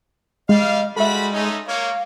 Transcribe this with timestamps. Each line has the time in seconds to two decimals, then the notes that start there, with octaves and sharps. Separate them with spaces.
0.49 G3 G#3 D#5 F5
0.96 G3 G#3 F#4 A4 E5 B5
1.33 A3 C#4 D#4
1.67 A#3 C#5 F5